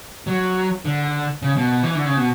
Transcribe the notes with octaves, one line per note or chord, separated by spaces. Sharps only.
F#3
D3
C#3
B2
E3
D3
C#3
B2